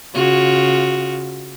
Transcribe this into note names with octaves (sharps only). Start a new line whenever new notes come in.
C#3 F4 F#4